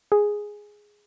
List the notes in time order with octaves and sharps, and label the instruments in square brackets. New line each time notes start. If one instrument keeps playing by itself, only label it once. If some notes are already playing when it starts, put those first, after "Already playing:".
[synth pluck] G#4